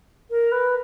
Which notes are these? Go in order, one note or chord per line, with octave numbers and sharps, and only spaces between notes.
A#4
B4